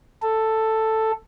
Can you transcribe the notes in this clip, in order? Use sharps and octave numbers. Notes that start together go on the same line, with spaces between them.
A4